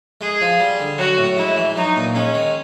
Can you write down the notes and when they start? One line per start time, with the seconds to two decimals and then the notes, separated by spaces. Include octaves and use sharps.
0.21 G#3 G#4
0.41 F3
0.59 G3
0.80 D3
0.98 F#3 F#4
1.18 A2
1.37 G#3 E4
1.57 E3
1.76 F#3 D#4
1.96 A#2
2.15 G#3 C#4
2.34 D#3